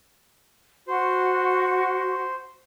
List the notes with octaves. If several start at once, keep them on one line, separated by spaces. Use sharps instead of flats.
F#4 C5